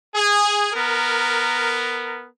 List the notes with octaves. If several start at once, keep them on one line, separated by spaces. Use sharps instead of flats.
G#4
B3 A#4